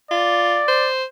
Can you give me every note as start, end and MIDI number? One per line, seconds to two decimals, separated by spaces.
0.11 0.62 65
0.11 0.90 74
0.68 1.04 72